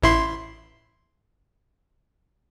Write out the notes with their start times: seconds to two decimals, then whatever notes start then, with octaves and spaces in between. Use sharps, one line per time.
0.03 A1 E4 C6